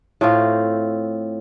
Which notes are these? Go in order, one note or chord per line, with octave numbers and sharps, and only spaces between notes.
A2 A3 C4 F4